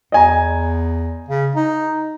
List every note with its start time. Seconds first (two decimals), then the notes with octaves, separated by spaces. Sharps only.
0.12 E2 D#5 G#5 A#5
1.28 C#3
1.56 D#4